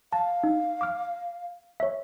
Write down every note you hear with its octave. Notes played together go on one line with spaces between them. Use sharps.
F5 A5
D#4
D6 F6
C#5 E5